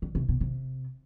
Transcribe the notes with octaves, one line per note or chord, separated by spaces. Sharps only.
D3
C3
B2
C3